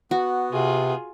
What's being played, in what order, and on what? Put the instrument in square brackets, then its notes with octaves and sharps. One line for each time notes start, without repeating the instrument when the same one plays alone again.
[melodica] B3 [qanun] F#4
[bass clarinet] C3 [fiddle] F4 G#4